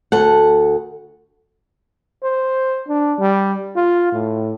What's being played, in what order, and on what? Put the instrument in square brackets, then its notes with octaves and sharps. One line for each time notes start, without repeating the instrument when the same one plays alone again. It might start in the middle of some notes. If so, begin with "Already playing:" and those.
[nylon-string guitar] D2 A4 F#5
[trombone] C5
D4
G3
F4
A2